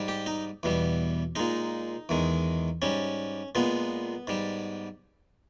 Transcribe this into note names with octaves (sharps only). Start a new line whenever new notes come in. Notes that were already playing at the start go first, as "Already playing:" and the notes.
Already playing: G#2 G3
G4
D#4
E2 B2 G3
A#2 G#3 D#4
E2 D#3 G#3
G#2 G3 C#4
A#2 G#3 B3
G#2 G3